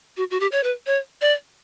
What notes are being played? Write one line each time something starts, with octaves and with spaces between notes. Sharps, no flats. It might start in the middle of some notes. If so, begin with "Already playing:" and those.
F#4
F#4
G4
C#5
B4
C#5
D5